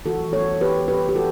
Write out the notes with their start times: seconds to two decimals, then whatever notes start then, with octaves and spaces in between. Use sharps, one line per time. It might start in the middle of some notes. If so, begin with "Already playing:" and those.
0.06 E3 F#4 A4
0.33 G3 B3 A4 C#5
0.61 E3 G4 B4
0.88 G3 B3 G4 B4
1.09 G4
1.15 E3 F#4 A4